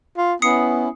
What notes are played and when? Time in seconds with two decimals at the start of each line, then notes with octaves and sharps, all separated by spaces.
0.17 F4
0.42 B3 C#4 E4 D#6 C7 C#7